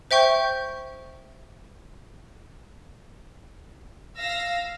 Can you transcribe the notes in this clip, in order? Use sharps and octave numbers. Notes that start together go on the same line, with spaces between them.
C5 E5 G5 C#6 G6
F5 E6 A#6